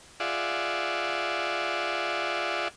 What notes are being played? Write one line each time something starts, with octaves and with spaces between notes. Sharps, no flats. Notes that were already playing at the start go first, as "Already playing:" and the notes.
F4 G#4 D5 E5 F#5